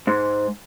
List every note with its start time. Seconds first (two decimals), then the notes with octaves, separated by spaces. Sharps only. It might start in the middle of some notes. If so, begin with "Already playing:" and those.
0.07 G#2